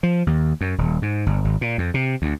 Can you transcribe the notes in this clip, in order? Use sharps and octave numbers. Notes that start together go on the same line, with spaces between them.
F3
D#2
F#2
D#1
G#2
G1
G#1
A#2
F2
C3
D2